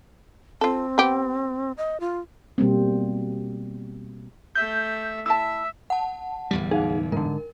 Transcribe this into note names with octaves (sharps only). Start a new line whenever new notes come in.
C4 F4 A4
B3 G4
D#5
F4
B2 G3 A#3 C4
A3 E5 G6
E4 E5 A5 E6
F#5 A5
D1 E2 G3
D#4 G#4 F5 F#5
G#2 D3 A#4